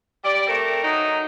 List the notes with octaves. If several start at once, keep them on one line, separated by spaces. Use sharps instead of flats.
G3 D5
A3 C4 A#4
F#3 D#4